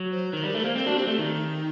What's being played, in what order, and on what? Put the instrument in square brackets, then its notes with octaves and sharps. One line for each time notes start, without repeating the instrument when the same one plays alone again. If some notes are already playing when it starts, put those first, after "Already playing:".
Already playing: [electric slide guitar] F#3
[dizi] C5
[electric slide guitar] D#3 [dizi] A#4
[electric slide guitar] G3 [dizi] A#4
[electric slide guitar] A3
[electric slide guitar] A#3 [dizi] C5
[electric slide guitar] C4 [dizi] C5
[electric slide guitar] D4 [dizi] F#4
[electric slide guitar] C4 [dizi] G4
[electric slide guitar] A3 [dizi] G4
[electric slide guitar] D#3 [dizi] D#4